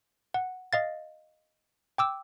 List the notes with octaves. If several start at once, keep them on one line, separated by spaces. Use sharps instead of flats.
F#5
D#5 F5 A6
G5 D6 E6